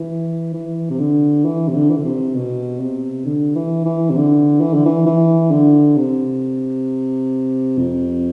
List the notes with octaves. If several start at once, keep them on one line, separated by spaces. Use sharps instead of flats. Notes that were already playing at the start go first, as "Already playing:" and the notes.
Already playing: E3
E3
C3
D3
E3
C3
D3
E3
D3
C3
B2
C3
D3
E3
E3
C3
D3
E3
D3
E3
E3
D3
C3
F2